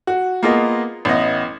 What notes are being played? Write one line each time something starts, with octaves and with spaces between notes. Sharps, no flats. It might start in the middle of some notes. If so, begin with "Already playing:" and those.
F#4
A#3 B3 F4 G#4 D#5
A1 B3 D#5